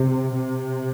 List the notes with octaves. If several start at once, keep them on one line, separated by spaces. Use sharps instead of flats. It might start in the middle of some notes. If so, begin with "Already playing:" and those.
Already playing: C3
C3